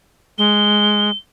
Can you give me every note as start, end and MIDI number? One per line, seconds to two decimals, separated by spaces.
0.38 1.10 56
0.38 1.16 103